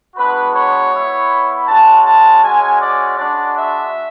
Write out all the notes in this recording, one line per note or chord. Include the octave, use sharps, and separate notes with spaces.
G#3 B3 D4 F#4 B4
C#5
B3 E4
G#3 C#4 F#4 A5
A5
G#3 C#4 F#4 G#5
D5
G#3 D4 F#4 D5
E5